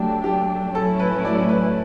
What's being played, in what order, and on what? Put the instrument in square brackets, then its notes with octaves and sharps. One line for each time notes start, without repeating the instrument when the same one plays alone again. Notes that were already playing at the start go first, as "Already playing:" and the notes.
Already playing: [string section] F#3 A3 D4 [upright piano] G4
[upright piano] G4
[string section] A2 F#3 A3 C#4 E4 [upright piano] A4
[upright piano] B4
D5
B4